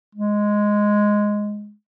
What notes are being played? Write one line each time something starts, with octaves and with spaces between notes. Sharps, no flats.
G#3